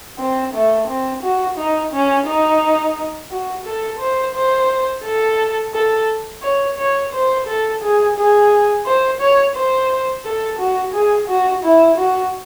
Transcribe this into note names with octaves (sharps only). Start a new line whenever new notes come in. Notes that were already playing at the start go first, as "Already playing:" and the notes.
C4
A3
C4
F#4
D#4
C#4
D#4
F#4
A4
C5
C5
A4
A4
C#5
C#5
C5
A4
G#4
G#4
C5
C#5
C5
A4
F#4
G#4
F#4
E4
F#4